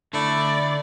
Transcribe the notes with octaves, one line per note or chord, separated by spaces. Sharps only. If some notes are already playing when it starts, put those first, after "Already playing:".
D3 A3 E4 D5